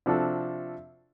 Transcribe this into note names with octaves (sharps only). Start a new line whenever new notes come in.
C3 F3 D4 F#4 A4